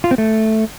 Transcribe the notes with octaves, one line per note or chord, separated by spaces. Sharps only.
F4
C4
A3